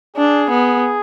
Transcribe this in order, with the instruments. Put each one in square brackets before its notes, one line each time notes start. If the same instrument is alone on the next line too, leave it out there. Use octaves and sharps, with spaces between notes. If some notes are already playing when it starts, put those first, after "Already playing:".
[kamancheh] D4 [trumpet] G#4
[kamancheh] B3